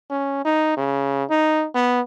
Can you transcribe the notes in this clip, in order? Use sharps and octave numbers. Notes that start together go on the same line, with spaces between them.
C#4
D#4
C#3
D#4
B3